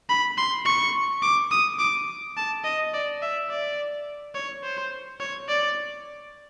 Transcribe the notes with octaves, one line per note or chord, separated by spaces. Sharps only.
B5
C6
C#6
D6
D#6
D6
A5
D#5
D5
E5
D5
C#5
C5
C#5
D5